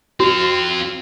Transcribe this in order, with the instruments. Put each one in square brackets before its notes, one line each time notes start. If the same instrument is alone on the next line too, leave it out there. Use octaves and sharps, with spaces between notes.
[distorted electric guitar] C4 F4 [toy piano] F#4